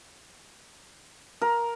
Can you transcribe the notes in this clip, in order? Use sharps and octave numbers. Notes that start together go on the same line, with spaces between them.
A#4